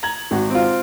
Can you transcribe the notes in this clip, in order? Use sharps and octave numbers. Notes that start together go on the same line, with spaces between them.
A#5 G#6 F#7
G#1 F#4
C4 F4